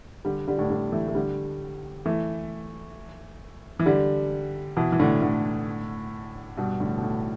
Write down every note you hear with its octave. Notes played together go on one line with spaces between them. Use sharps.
D3 G3
D3 G3
A2 D3
D3 G3
E3 A3
A3
D3 G3
E3 A3
E3
D3 G3
B2 E3
E3
A2 D3
A2 D3
G2 B2
A2 D3
B2
A2